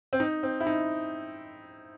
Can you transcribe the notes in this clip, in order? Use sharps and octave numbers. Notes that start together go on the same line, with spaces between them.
C4
D#4
C4
E4
D#4